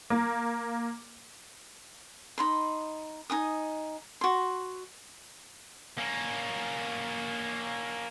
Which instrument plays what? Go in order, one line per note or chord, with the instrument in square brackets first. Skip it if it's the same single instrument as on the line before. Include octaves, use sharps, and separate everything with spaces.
[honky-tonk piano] A#3
[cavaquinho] D#4 B5 C6
D#4 G#5 D#6
F#4 C6
[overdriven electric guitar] A#3 C#4